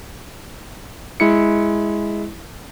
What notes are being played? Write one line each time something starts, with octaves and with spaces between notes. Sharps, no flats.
G#3 E4 C#7